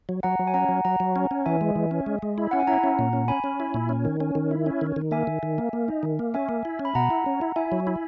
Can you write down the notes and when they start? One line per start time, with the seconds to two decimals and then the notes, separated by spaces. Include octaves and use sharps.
0.09 F#3
0.23 F#3 F#5 A#5
0.39 F#3
0.47 G#5
0.54 C#4 F#5 A#5
0.69 F#3
0.85 F#3 F#5 A#5
1.00 F#3
1.16 C#4
1.31 C#4
1.46 E3 E5 G#5
1.61 G#3
1.75 E3
1.91 C#4
2.06 G#3
2.22 G#3
2.38 E4
2.51 C#4 F#5
2.60 G#5
2.67 E4 F#5 A#5
2.84 C#4
2.99 A#2
3.13 C#4
3.28 C#4 G#5 B5
3.44 C#4
3.60 E4
3.74 A#2
3.89 C#4
4.05 D#3
4.20 C#4
4.35 D#3
4.51 E4
4.66 C#4
4.81 D#3
4.96 D#3
5.11 A#3 E5 G#5
5.27 D#3
5.43 D#3
5.58 A#3
5.73 A#3
5.88 D#4
6.03 D#3
6.19 A#3
6.34 C#4 E5 G#5
6.49 A#3
6.65 E4
6.79 C#4
6.85 B5
6.95 B2 F#5 A#5
7.10 E4
7.26 C#4
7.41 E4
7.56 E4 E5 G#5
7.72 F#3
7.87 E4